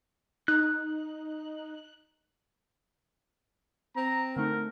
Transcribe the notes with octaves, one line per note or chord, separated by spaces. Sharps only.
D#4 F#6
C4 A#5
D3 A3 D#4 A#4